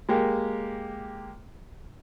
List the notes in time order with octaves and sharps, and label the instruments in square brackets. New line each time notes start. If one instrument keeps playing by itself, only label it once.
[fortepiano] G#3 A#3 G4